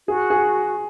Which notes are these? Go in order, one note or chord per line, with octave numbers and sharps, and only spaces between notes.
F#4 G#4
G#4